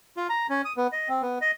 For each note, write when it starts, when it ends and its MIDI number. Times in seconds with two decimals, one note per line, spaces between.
0.17 0.27 65
0.30 0.47 82
0.50 0.62 61
0.65 0.73 87
0.77 0.87 59
0.93 1.09 75
1.09 1.22 60
1.22 1.39 59
1.41 1.51 75